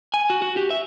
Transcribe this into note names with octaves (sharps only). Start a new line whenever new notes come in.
G#5
F#4
F#4
G4
E5